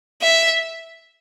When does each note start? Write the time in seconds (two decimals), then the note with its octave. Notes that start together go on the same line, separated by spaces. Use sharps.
0.22 E5